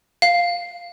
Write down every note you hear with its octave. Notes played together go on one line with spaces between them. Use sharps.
F5